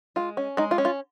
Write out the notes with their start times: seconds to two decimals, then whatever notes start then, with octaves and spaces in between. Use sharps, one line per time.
0.16 G#3 F4
0.37 C#4
0.57 G#3 D#4
0.71 F4
0.78 C#4
0.85 F4